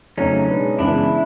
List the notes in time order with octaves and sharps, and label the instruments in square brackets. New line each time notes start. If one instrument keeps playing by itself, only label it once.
[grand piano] F2 C#3 F#3 A3 [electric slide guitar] C#4 D#4
[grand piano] B2 G#3 B3 D4
[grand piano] F#2 C#3 E3 G#3 B3 [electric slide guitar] D4 E4